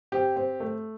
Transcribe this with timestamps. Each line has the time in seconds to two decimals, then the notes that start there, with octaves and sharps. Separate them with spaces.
0.12 C4 G4
0.36 C4
0.60 A3